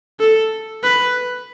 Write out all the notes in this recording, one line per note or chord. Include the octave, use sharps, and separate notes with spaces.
A4
B4